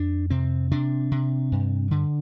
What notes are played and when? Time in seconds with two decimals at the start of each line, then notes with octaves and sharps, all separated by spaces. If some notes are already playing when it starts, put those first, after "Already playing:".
Already playing: F2 D4
0.30 C3 C4
0.71 C3 D4
1.11 C3
1.52 G2
1.91 D3